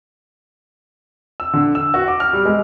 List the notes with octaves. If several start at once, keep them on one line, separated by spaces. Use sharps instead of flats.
E6
D3
E6
F#4
D6
F6
G3
G#3